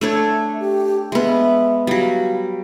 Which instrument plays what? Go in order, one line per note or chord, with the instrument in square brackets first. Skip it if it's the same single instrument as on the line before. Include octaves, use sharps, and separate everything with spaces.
[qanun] A3 D4 C#5 [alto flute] E5
[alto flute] G4
[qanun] G#3 B3 [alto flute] E5
[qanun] F#3 G3 [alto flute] F5